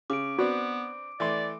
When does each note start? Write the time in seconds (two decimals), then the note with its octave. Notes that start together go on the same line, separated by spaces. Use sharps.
0.10 C#3 D6 D7
0.39 B3 C4 D4 F#4 B4
1.20 E3 A3 D5 C6